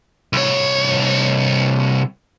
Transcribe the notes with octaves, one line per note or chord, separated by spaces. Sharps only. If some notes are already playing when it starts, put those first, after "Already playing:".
C2 C#5